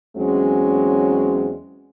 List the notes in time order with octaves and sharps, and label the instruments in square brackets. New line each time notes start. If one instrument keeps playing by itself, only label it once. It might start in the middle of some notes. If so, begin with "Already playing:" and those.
[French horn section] E2 F#3 G#3 C4 C#4